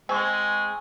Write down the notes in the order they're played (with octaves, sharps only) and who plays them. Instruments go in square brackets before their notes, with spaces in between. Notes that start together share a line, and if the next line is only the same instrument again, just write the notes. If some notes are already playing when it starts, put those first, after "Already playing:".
[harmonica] G#3 [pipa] C4 [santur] G#5 C#6